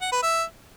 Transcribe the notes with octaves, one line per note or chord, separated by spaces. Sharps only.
F#5
B4
E5